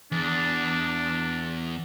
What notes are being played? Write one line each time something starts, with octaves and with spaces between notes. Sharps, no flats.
E2 D4